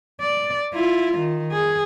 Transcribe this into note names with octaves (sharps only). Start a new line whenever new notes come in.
D5
E4 F4
D#3
G#4